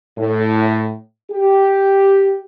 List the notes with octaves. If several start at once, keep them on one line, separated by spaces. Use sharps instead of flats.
A2
G4